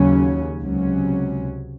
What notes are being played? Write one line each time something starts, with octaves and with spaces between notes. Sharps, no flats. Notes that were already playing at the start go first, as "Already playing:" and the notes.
Already playing: D#2 C#3 F#3 C#4
C#2 C3 F#3 C#4